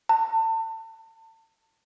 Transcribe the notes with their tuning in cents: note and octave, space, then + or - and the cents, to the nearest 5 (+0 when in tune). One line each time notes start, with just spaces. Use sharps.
A5 +35